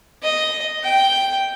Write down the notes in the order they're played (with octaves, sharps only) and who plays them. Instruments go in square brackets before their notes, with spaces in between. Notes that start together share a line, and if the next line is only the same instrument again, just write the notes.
[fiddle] D#5
G5